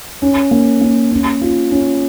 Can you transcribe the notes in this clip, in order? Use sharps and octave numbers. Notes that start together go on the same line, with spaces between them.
C#4
A#3
A#3
C#4
F4
C#4